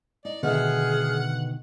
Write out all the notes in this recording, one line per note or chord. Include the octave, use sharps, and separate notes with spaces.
D#4 D5
B2 D3 D#3 B3 G#4 E5 F#5 F6